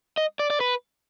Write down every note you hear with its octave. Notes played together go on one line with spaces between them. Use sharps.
D#5
D5
D5
B4